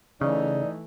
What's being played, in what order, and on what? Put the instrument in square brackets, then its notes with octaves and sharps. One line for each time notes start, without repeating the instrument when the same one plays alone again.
[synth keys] C#3 [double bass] E3 A3 [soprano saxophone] D#4 [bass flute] D5